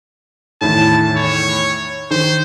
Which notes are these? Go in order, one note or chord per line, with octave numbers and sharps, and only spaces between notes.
E2 A2 D#3 A5
C#5
D#3 C5